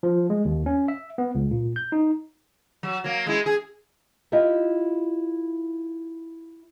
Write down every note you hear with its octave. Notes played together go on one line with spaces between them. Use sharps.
F3
G#3
D#2
C#4
E5
B3
C#2
A#2
G6
D#4
F#3
F#3 A#3
G#3 E4
G#4
E4 F4 G4 D#5 E5